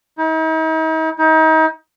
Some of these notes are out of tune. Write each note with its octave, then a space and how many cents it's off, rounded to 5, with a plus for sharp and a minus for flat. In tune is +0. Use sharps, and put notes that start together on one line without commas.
D#4 +45
D#4 +35